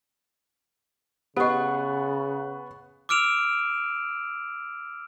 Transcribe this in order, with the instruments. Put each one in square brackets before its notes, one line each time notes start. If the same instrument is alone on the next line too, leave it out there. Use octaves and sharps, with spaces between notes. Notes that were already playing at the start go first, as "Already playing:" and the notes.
[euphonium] C#3 [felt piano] B3 [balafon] G4 D#5 [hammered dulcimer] F#5 C#6
[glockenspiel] D6 E6 F6 D7 E7 F7